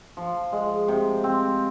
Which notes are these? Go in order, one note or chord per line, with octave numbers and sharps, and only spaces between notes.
F3
G#3
C3
C4